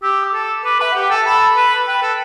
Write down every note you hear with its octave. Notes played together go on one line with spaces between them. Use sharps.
G4 E6
D6
A4
B4 D6
B4 E5
G4 F#5
G5
A4 A5
A4 B5
B4
B4 G5
A4